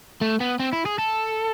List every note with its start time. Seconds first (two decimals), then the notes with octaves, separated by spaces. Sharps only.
0.21 A3
0.40 B3
0.59 C4
0.73 E4
0.86 G#4
0.99 A4